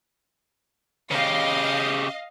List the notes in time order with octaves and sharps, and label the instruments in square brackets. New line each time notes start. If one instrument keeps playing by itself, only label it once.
[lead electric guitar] C#3 G4 [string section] D#5 F5